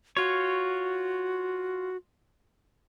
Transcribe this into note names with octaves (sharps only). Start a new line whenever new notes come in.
F4 F#4 C#5